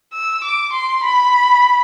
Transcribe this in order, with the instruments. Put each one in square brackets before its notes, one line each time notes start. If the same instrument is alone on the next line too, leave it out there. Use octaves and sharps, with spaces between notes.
[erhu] E6
D6
C6
B5